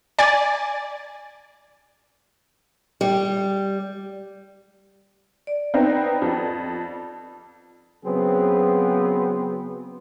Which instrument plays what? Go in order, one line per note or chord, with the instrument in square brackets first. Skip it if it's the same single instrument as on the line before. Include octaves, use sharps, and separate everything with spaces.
[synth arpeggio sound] D5 G#5 A6
[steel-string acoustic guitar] G3
[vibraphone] D5
[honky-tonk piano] B3 C4 D#4
F2
[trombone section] C#3 F#3 B3 C4 G#4